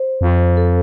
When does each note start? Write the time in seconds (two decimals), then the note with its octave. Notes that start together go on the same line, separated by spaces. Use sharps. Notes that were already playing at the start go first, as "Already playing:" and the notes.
Already playing: C5
0.21 F2
0.57 A4